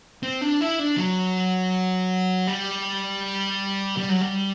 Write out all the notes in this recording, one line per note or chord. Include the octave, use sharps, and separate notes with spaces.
C4
D4
E4
D4
F#3
G3
G3
F#3
G3